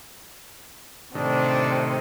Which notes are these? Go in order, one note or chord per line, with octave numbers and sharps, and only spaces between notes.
A2 C3 D#3 D4